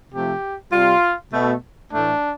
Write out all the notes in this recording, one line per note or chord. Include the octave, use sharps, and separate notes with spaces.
C3 F3 A3 G4
C3 G3 F4
B2 A3
A2 E3 A3 D4